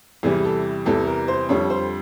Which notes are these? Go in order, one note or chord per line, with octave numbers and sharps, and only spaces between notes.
E2 C3 E3 G3 G#4
A4
E2 C3 E3 G3 A4
A#4
C5
F2 D3 G3 C#5
C5